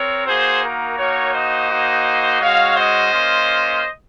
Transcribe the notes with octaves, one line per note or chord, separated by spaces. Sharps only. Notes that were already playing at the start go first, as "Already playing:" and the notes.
Already playing: C4 A#4 C#5
A#3 D#4 F#4 G#4 C5
A#4
A#3 D#4 F#4 A#4 C#5
C5 D#5
A#3 D#4 F#4
G#3 C#4 F#4 C#5 F5
C5 D#5
A#3 C#4 F4